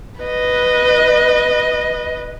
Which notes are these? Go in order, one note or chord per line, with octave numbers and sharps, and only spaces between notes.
B4 D#5